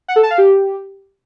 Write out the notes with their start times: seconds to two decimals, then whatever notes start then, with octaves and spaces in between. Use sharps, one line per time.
0.08 F#5
0.16 A4
0.23 A5
0.31 F5
0.38 G4